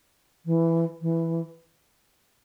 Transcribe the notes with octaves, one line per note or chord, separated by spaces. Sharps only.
E3
E3